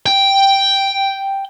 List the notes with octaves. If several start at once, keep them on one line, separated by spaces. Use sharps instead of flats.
G5